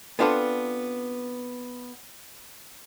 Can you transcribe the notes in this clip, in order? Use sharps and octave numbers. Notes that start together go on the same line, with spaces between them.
B3 C4 D4 F4 A4 B4